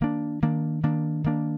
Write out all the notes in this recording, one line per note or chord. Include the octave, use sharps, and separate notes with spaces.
D#3 A#3 D4
D#3 A#3 D4
D#3 A#3 D4
D#3 A#3 D4